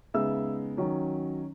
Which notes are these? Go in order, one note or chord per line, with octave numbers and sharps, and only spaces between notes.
C#3 G#3 B3 D#4 E5 E6
D#3 F#3 C#4